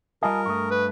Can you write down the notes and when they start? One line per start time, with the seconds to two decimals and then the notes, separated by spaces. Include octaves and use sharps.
0.23 G3 F4 A#4 D#5 G#5 A5 D#6
0.46 G2 A3 C#6 D#6
0.71 B4